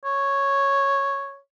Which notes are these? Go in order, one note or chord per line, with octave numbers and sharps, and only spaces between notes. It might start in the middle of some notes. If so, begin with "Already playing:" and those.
C#5